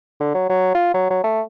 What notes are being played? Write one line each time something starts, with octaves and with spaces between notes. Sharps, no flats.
D3
F#3
F#3
F4
F#3
F#3
A3